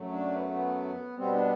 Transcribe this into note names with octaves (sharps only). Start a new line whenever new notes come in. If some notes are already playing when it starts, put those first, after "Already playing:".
Already playing: F#2 F#3 A3
D4
B3
B3
B2 G3 B3 C4
D4